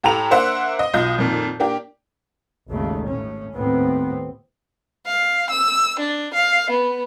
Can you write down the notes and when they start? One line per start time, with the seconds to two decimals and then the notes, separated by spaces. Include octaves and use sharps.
0.04 A2 G4 A4 A#5 B5 F7
0.31 A#3 D4 C5 E5 F#5
0.79 D#5
0.94 B1 F4 D#5 G6
1.18 F2 A#2 D#3
1.60 A#3 D4 G4
2.69 G#1 D#2 C#3 A3
3.08 A2 C#4
3.55 D#2 A2 B3 C4
5.06 F5
5.50 E6
6.00 D4
6.34 F5
6.71 B3